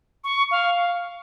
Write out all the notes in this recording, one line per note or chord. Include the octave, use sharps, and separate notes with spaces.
C#6
F5